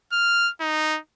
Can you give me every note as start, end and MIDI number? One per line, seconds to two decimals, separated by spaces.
0.13 0.50 89
0.61 0.99 63